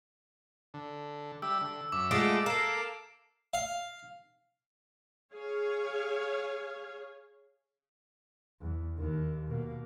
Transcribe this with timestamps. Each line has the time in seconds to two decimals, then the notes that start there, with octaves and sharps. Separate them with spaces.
0.74 D3
1.42 G3 G4 E5 E6
1.61 D3
1.92 F#2 E5 D6
2.11 G#3 A3 F4 D5 F#5 D6 D7
2.46 A#3 A4 F5 A#5 C7 E7
3.54 F5
5.32 G#4 C#5 F5
8.61 E2
8.98 D#2 D#3
9.48 B2 A#3